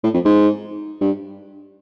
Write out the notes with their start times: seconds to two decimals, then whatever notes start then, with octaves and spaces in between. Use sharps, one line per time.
0.03 A2
0.14 F2
0.25 G#2
1.01 G2